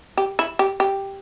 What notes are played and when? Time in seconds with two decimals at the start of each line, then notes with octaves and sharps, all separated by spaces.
0.17 G4
0.39 E4
0.59 G4
0.80 G4